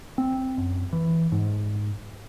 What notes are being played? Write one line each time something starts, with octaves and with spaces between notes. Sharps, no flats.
C4
F#2
E3
G#2